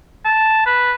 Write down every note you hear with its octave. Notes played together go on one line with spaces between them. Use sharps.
A5
B4